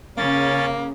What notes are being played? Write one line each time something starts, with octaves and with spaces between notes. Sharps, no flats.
C#3 A#3 C#4 A6